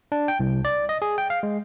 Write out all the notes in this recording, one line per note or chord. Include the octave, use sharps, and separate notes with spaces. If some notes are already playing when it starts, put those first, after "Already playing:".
D4
G5
C2
D5
D#5
G#4
G5
F5
G#3